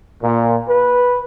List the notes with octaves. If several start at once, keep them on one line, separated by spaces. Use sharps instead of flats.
A#2
B4